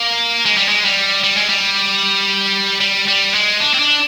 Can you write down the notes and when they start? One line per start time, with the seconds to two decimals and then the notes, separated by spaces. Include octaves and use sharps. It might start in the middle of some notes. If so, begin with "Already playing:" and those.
Already playing: A#3
0.45 G#3
0.57 G3
0.68 G#3
0.85 G3
1.24 G3
1.37 G#3
1.49 G3
2.81 G3
3.07 G3
3.34 G#3
3.60 D4
3.74 C4
3.79 D4